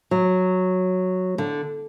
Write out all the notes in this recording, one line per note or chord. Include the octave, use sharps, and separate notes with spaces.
F#3
D3